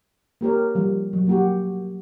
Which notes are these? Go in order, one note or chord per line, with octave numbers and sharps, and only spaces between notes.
A#3 G4 A#4 C#5
F3 G3
F#3
A#3 F#4 G4